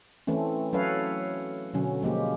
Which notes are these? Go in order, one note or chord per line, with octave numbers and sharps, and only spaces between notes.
E3 A3 C4 C#4
F#3 C#4 A4 B4 C#5 F5
B2 D3 F#3 C#4
F3 G#3 A#3 G4